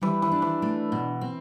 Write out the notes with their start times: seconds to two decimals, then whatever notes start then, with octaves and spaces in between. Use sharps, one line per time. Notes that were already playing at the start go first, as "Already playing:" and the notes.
0.01 E3 G3
0.22 E3
0.32 D4
0.42 E3
0.62 A3
0.92 B2
1.21 C4